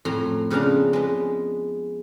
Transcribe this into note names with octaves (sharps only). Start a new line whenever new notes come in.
F2 A2 A#5 C6
F2 C#3 B3 D4 F5 A#5
G#3 B3